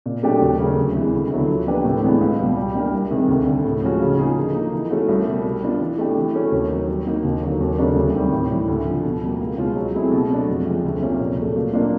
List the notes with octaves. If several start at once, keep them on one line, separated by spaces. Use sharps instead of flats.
A#2
F#3 A3 D4 G4
D#2
C#3 F#3 A3
D2
C3 E3 G#3
D2
D3 F#3 B3 E4
F3
A#3 D4 G4 B4
A2
E3 G#3 B3 D4
C#2
B2 G3
G3
A#3 D4 G4 A#4
C2
C3 D#3 G#3 C4
D2
D3 G3
A2
F3 G#3 C#4 F#4
C#3
F3 A#3 D#4 G#4
D3
F3 A#3 D#4
E3
A3 C#4 F#4
C2
B2 G3
G3
B3 D4 F4
E3
A3 D4 G4
E3
A3 C#4 F#4
D#2
D#3 F#3
G3
A#3 D#4 F#4
D#2
D3 F#3 A#3
D#2
C#3 F#3 A3 D4
D2
C3 D#3 G3 C4
A2
E3 G3
D2
D3 F3
B2
G3 A#3
C#2
B2 G#3 C#4 F4
F#3
A3 C4 E4 G#4
B2
F#3 A3 D4
F2
C3 F3 G#3 C4
D2
C3 F3 A#3 C#4
A#2
F#3 A3
A#2
F#3 A#3 D4 F4